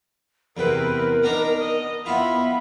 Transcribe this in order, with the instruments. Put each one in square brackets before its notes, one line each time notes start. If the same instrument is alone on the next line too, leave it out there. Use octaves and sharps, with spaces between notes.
[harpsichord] E2 C3 G5 [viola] C4 B4 [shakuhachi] A#4
[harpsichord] B3 D4 D#4 [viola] A#5
[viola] D#5
[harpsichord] B3 E4 F4 [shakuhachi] E5 [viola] B5